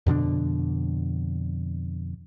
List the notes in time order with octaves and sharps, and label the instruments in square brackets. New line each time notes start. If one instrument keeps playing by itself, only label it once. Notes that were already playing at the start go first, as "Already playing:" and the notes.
[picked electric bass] F2 B2 D3 D4